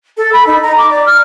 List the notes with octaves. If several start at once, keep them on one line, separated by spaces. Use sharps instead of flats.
A4
B5
D#4
A#5
D6
D5
F6